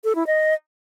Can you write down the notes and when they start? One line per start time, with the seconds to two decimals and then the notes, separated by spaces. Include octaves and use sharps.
0.04 A4
0.15 E4
0.27 D#5